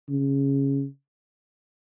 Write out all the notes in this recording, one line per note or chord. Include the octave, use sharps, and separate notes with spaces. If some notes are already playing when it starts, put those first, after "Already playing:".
C#3